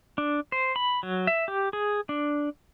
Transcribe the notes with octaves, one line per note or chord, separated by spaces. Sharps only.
D4
C5
B5
F#3
E5
G4
G#4
D4